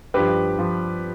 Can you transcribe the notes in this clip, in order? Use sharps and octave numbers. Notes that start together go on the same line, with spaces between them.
G2 F3 G4 B4
F3